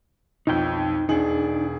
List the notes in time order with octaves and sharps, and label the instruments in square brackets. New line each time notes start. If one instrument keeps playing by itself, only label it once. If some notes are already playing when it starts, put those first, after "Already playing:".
[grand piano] B1 F2 [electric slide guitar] D#4 G5
[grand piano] E1 G#4 F#7 [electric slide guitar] D4 D#4